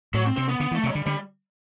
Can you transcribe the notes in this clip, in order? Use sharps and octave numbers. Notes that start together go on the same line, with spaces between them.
A2 F#3
C4
C3 C4
B3
D3 B3
E3
A3
C3 F#3
D3 G3
D3 G3